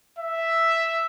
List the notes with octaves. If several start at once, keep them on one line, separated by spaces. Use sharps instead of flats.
E5